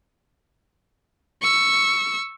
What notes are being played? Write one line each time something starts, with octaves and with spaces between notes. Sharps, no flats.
C#6 E6